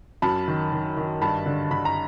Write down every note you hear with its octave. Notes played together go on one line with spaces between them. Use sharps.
F#2 A5 B5
D#3
D#3
D#3
G2 A5 B5
D3
D3 B5
A#5